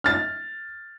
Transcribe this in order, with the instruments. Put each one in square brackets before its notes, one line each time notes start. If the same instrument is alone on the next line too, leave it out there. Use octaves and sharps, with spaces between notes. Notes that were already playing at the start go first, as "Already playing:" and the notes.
[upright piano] F6 A6